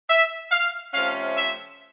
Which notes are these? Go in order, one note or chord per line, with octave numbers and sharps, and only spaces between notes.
E5
F5
C3 F3 A3 C#4 F5
E5